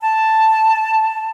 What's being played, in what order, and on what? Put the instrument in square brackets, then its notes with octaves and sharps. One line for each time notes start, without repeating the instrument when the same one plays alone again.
[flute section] A5